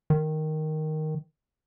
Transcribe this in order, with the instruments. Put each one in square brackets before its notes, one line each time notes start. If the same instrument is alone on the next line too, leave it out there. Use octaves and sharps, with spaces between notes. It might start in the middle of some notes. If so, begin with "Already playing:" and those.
[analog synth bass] D#3